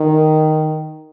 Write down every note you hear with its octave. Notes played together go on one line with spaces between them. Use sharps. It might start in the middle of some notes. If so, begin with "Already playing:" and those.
Already playing: D#3